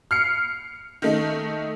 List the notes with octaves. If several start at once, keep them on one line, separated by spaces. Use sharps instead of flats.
F6 C7 C#7
D#3 A3 D#4